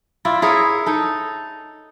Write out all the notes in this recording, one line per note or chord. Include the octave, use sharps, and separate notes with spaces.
E4 F4 D5
E4 G#4 A#4 C#5
D#4 A4